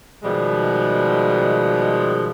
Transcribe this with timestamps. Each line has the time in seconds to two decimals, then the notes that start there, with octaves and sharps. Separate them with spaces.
0.23 B2 D#3 F3 G3 G#3